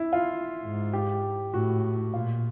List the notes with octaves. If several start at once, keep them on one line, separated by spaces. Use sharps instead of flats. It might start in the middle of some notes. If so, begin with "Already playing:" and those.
Already playing: E4
F4
G#2
G4
A2 F#4
A#2 F4